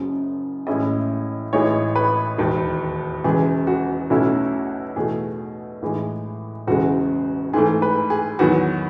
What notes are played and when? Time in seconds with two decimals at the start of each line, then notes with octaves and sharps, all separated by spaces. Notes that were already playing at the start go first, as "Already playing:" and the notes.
Already playing: F#1 F#2 C#3 F#3
0.67 A1 A2 G#3 C#4 E4 D#5
1.53 A1 A2 E3 G#3 D#4 C#5
1.96 B4
2.38 E1 D#2 D#3
3.24 E1 E2 C#3 E3 G#3 G#4
3.67 F#4
4.10 B1 B2 A3 C#4 E4
4.96 E2 B2 A3 G#4
5.82 A2 E3 G#3 D#4
6.67 E1 E2 C#3 G#3 F#4
7.53 G#2 E3 A3 G#4
7.82 B4
8.10 G#4
8.39 E2 D#3 F#3 B3 F#4